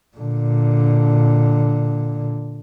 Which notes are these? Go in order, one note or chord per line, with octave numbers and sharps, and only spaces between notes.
A#2 D3